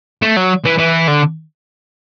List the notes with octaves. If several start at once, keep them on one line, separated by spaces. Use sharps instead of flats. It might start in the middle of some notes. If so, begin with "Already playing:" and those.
A3
F#3
E3
E3
D3